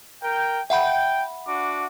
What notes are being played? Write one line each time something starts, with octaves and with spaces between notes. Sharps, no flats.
A#4 G5
E5 F#5 G5 B5
D4 F#4 D6